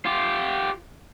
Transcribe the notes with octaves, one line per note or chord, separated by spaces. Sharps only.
F4 G4